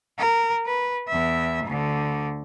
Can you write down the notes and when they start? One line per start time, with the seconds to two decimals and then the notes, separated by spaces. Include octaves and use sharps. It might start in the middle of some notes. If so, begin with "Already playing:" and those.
0.19 A#4
0.66 B4
1.08 E2 E5
1.65 D2 D3